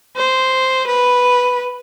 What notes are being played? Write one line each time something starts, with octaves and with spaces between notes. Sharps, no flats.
C5
B4